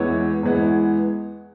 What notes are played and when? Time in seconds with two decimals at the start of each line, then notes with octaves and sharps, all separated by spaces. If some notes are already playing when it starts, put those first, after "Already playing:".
Already playing: E2 E3 G#3 B3 E4 C#5
0.43 E2 E3 G#3 B3 E4